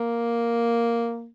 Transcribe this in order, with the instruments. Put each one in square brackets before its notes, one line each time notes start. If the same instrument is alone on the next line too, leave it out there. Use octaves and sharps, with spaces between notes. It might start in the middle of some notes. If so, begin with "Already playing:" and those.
Already playing: [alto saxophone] A#3